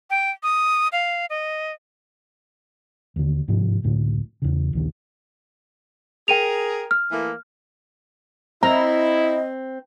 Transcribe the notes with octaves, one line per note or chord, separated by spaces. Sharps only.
G5
D#6
F5
D#5
D#2 D3
G1 G#2 C3 F3
F1 C#2 A2 D3
E2 C#3
A#1 D#2 D#3
G#4 A#4 G5 D#7 F7
F6
E3 A3 A#3
C4 E4 D#5 A#5